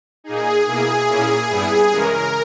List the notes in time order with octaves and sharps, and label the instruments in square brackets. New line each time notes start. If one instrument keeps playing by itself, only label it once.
[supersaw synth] A#2 A#3 D#4 G#4
B2 A#3 E4 G#4
A#2 A#3 C#4 E4
G2 G3 B3 E4
C#3 E3 G#3 C#4 A#4